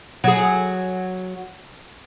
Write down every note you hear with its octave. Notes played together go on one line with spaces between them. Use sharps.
F#3 G#4